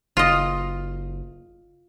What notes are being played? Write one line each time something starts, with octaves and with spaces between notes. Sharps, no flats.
F#1 F4 D#5